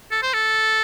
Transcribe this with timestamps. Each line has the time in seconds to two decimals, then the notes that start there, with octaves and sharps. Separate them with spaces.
0.11 A4
0.23 C5
0.33 A4